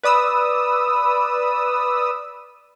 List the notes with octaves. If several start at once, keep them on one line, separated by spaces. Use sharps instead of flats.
B4 D5 D#6 E6